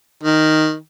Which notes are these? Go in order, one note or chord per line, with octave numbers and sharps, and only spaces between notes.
D#3